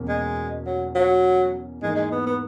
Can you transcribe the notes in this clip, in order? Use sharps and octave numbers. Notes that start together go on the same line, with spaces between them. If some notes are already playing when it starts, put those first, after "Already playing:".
Already playing: E2 B2 A#3 C#4
G#3
F#3
F#3
G#2 E3 G#3 A#3 D#4 A#4
G#3
B3
B3